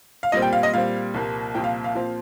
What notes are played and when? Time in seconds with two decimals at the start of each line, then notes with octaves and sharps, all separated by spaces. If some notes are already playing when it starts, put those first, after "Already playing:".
0.23 F5
0.32 A#2 G3 C4 D#5
0.42 G5
0.53 F5
0.63 D#5
0.74 A#2 G3 C4 F5
1.14 C2 A#2 F3 A#3
1.54 C2 A#2 F3 A#3 G5
1.64 F5
1.84 F5
1.95 A#2 F3 C4